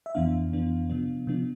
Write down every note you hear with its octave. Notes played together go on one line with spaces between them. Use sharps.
E5
F2 E3 B3 D4 F5
F2 E3 B3 D4
C3 F3 B3 D4
C3 F3 B3 D4